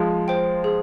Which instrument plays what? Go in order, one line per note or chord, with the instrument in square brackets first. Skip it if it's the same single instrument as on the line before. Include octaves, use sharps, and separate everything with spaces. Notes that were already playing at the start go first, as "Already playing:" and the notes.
Already playing: [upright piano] F3 G#3
[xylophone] C5 G5
G#4